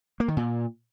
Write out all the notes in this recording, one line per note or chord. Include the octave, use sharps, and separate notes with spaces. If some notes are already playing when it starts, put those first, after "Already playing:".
A#3
D#3
A#2